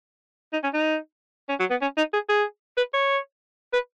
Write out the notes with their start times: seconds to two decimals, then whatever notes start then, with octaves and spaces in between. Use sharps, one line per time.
0.53 D#4
0.63 C#4
0.74 D#4
1.49 C#4
1.59 F#3
1.70 B3
1.81 C#4
1.97 D#4
2.13 G#4
2.29 G#4
2.77 B4
2.94 C#5
3.73 B4